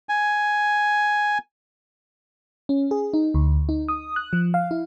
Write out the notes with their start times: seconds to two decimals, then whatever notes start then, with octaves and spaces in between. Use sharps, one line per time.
0.09 G#5
2.69 C#4
2.91 G#4
3.14 D#4
3.34 D2
3.69 D#4
3.88 D#6
4.16 F#6
4.33 F3
4.54 F5
4.71 E4